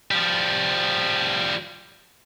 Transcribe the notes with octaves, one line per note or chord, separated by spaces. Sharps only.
F3 G3